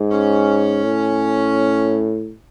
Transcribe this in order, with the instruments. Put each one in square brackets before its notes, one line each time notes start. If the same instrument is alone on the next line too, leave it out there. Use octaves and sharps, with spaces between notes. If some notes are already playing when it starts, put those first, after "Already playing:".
Already playing: [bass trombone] G#2
[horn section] C#4
[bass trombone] A2